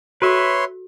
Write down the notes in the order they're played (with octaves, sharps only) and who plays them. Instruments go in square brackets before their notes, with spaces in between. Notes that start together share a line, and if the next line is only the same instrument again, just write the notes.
[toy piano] F#4 A4 [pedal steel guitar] B4 E5 [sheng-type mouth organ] C#5 C6